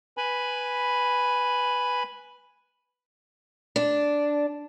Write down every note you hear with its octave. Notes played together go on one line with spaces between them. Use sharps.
B4 G#5 B5
D4